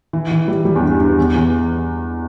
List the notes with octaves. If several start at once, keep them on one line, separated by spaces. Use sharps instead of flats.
E3
E3
G3
G3
E2
G2
G2
E2
E2